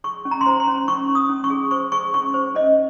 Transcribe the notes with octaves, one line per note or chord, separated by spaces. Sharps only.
G#4 C#6
C#4
A#5
C6
C5 A#5
C6
C#4
C#4 C#6
C#4
D#6
C#4
C#6
G#4
C5 C#6
G#4 C#6
C#4 C#6
C5
C#4 D#5